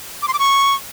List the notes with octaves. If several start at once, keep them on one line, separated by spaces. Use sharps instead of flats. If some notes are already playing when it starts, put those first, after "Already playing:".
D6
C6
D6
C#6